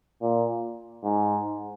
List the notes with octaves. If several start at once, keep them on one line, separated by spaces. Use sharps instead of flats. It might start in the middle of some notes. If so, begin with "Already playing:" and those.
A#2
G#2